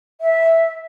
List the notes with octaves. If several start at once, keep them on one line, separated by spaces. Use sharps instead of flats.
E5